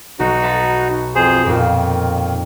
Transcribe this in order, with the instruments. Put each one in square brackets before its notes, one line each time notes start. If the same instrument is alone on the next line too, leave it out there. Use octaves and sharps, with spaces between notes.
[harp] B1 [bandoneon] D#4 F#4
[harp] E5 A5 B5
[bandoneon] F2 G#4 C5
[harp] F2 A#2 [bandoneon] D#3